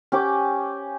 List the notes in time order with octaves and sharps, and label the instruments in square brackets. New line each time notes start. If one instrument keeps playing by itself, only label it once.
[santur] C#4 G4 D6